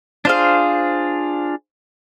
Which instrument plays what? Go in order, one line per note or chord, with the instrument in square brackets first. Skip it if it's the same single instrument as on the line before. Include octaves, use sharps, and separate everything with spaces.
[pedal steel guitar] D4 F4 G#4 [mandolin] C5 F5